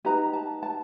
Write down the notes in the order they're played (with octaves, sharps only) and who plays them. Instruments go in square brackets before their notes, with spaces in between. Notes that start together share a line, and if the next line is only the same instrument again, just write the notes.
[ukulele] D#4 G4 B4 A#5
A5
A5